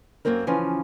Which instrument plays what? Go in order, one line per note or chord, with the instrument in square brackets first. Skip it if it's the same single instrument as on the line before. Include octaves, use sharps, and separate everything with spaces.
[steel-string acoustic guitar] F#2 C3 F#3 A#3 C4 A#4
C#3 E3 F3 C#4 G#5